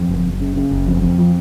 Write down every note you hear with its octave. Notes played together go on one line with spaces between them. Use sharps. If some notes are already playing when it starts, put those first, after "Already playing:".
Already playing: F2
F#1
F#1
C#3
C#3
F#1
F2
F2
F3